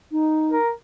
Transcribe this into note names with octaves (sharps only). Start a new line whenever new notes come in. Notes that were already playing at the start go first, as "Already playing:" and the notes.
D#4
A#4